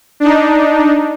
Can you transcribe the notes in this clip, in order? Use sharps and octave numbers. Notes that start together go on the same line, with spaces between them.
D4 D#4